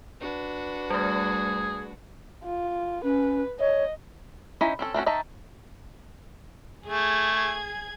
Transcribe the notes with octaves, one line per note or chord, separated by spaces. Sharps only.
D4 F#4 B4
G3 A3 G#4
F4
C#4 B4
C#5 D#5
C#4 D#4 E4 D#5
C4 C#4 A4
A3 C4 C#4 F#4
D#3 D#4 E5 A5 A#5
A3 G#4 G#6